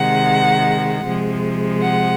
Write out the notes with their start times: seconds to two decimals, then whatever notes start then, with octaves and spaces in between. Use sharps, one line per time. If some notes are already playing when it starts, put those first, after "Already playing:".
Already playing: C3 D#3 G#3 F#5
1.05 C3 F3 G#3
1.81 F#5